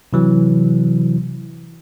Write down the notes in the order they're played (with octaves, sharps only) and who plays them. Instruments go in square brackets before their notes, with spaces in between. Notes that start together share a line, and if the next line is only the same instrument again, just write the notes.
[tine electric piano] C3 E3 F#3